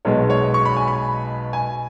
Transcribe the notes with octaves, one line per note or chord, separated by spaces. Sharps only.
B1 B2 G#3 C#5
C#5
C#6
B5
G#5
B5
G#5